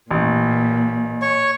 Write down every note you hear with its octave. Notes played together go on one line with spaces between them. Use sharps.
A1 A#2
C#5 C#6